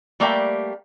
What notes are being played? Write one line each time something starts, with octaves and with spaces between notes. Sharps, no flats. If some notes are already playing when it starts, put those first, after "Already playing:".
G3 A3 A#3 D5 E5 G5